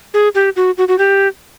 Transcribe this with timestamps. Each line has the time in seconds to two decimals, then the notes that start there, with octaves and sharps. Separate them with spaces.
0.14 G#4
0.35 G4
0.56 F#4
0.78 F#4
0.88 F#4
0.98 G4